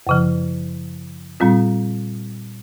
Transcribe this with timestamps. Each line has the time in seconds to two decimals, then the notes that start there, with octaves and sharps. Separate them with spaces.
0.07 F#2 C#3 F3
1.40 A#2 G3 C4 F4